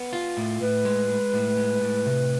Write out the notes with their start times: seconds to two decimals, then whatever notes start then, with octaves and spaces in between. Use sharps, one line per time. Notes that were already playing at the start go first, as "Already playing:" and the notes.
Already playing: B3
0.13 F4
0.37 A2
0.61 A2 B4
0.85 G#3
1.09 G#3
1.34 A2
1.57 G#3
1.81 A2
2.06 C3